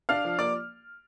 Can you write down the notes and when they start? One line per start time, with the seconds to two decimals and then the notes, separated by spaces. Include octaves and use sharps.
0.09 D4 F5 F6
0.25 F3
0.39 A#3 D5 D6